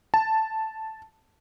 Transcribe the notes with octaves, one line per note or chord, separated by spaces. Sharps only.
A5